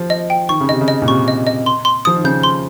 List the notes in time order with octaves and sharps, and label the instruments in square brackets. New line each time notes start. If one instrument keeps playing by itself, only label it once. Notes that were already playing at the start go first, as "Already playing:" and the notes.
Already playing: [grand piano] F3
[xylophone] D#5
G5
[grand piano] D#3 [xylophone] C#6
[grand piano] C#3
[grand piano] C3 [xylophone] D#5
[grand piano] C#3
[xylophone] D#5
[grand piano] A#2
[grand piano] C3 [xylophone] C#6
[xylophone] D#5
D#5
C6
C6
[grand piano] F3 [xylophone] D#6
[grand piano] D#3
[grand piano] C#3 [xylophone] G6
[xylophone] C6